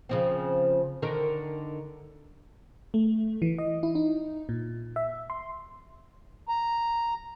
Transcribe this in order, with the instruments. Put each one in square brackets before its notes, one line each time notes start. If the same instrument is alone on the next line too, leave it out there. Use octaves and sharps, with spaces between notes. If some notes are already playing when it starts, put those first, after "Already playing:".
[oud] C#3 F3 C4
D3 D#3 A#4
[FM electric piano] A3
E3
D#5
E4
D#4
A#2
E5
C6
[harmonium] A#5